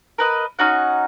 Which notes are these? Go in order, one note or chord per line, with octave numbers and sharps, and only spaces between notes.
A#4 B4 D#5
C#4 D#4 F#4 F#5